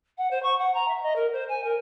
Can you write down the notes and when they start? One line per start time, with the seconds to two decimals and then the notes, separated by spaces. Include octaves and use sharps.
0.18 F#5
0.31 C5
0.43 C#6
0.58 F#5
0.74 A#5
0.88 E5
1.03 D#5
1.16 A#4
1.32 C5
1.49 G#5
1.64 A#4